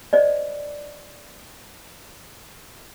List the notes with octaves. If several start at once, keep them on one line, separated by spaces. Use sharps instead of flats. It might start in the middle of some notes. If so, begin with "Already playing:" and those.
C5 D5 D#5